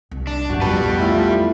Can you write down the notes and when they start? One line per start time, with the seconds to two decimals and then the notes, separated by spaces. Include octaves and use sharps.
0.11 C2
0.27 D4
0.50 F#2 G3 F#4 G4 F#5
0.61 B1 F2 G3 B3 B4 A5
0.99 A3 E4 F4